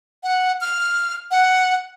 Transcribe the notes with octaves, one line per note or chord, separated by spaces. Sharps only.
F#5
F6
F#5